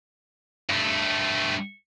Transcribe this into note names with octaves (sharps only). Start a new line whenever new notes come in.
G2 A3